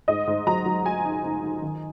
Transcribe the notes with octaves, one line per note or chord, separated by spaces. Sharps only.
G#2 D#5
G#2
F#3 A#5
F#3
F#3 G#5
D#4
D#4
D#4
D#3